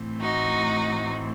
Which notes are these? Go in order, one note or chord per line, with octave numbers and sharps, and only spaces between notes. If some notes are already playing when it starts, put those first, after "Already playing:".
Already playing: A2 E3 A3 C4
D#4 F#4